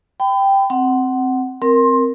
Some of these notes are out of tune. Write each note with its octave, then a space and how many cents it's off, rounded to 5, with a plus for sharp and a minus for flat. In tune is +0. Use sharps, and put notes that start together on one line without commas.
G5 +0 B5 +35
C4 +0 F#5 +15
C4 +0 A#4 +0 C6 +20